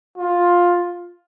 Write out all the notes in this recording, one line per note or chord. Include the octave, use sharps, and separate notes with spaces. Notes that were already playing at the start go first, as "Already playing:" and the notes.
F4